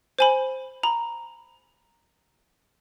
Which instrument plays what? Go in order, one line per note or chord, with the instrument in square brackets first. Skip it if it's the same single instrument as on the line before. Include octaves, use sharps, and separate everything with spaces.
[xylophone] C5 G#5 B5
A#5 B5